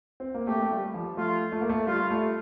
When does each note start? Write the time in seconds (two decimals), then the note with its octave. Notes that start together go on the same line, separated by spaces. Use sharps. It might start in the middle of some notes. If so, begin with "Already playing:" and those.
0.20 C4
0.34 A#3
0.47 A3 G4
0.61 A3
0.71 G3
0.94 F3
1.17 A3 F4
1.52 A3
1.61 A#3
1.69 A3
1.86 G3 F4
2.10 A3